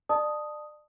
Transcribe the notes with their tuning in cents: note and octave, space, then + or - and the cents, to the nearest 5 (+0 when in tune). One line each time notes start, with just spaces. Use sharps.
D5 +30 A5 +0 D#6 +0